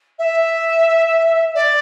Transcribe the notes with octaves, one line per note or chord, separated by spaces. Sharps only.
E5
D5